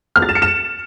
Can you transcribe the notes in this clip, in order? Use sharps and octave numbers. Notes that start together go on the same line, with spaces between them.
F6
A6
E7
C#7
E7